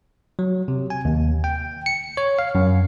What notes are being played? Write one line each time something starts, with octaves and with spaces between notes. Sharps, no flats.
F#3
C3
G#5
D#2
G5
C#7
C#5
F5
F#2